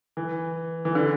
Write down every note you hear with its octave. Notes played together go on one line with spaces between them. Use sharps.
E3
E3
D3